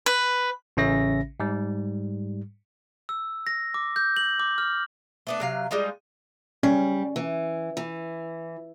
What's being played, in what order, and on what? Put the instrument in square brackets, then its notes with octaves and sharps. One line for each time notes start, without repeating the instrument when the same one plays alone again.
[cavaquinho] B4
[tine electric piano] A1 C#3 C#4 E5 A#6
G#2 G3
[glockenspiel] E6
A#6
D6
G6
F#7
D6
F6
[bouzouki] A3 B3 D4
C3 F#3 F5
G3 G#3 D#4 F4
[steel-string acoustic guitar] G3 [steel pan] C#4
[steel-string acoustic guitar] E3
E3